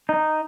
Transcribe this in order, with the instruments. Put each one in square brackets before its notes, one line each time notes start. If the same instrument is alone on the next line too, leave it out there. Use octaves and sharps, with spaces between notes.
[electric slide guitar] D#4